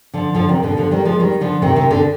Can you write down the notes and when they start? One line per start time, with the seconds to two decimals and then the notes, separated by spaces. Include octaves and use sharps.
0.14 D3 F3
0.35 D3 F3
0.49 C3 D#3
0.63 B2 D3
0.77 D3 F3
0.91 D#3 G3
1.05 F3 G#3
1.20 D#3 G3
1.41 D3 F3
1.62 C3 D#3
1.76 C3 D#3
1.90 B2 D3